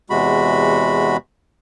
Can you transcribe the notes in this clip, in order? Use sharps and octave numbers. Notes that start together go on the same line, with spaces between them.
E2 C3 G#3 F#4 B5